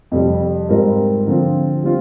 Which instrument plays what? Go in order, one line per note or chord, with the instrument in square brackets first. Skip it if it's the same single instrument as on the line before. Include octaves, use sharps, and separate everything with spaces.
[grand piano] F2 C3 G3
G#2 G3 C4 F4 A#4
D3 F3 C4 F4
G3 C4 F4